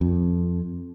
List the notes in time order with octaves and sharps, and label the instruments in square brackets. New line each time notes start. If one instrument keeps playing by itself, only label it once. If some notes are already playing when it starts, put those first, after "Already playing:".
[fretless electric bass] F2